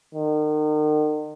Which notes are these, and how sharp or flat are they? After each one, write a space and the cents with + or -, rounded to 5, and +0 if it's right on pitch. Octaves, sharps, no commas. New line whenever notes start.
D#3 -40